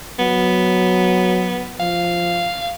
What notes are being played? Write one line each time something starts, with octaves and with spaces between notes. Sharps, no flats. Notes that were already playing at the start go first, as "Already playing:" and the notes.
F#3 B3
F3 F5